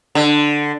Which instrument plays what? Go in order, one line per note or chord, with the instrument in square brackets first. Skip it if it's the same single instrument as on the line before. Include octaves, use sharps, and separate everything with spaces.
[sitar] D3